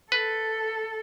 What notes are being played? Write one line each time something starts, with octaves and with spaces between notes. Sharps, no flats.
A4 B4